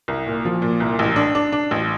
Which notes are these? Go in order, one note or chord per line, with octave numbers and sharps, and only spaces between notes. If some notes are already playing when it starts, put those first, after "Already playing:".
C2
A#2
F3
A#2
C2
A1
D4
D4
D4
A1